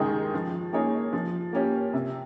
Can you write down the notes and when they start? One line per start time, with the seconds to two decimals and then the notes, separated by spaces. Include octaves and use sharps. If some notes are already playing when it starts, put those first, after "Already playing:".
Already playing: D#2 D#3 G#3 D#4 G#4
0.34 F3
0.73 A#3 D#4 G#4 C#5
1.13 F3
1.53 A#3 C#4 G4 C#5
1.93 C3